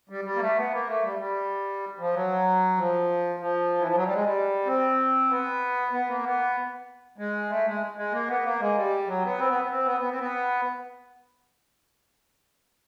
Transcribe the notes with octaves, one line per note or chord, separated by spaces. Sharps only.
G3
G3
A#3
A3
B3
A#3
A3
G3
G3
F3
F#3
F3
F3
E3
F3
F#3
G3
G#3
G3
C4
B3
B3
A#3
B3
G#3
A3
G#3
G#3
A#3
B3
A#3
G#3
G3
F#3
B3
C4
B3
C4
B3
B3
C4
B3